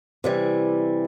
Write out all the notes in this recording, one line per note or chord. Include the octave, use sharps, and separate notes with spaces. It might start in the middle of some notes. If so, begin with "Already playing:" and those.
C3 E3 G3